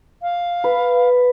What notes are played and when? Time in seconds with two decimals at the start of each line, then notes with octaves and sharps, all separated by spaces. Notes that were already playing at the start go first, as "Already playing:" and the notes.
0.22 F5
0.64 B4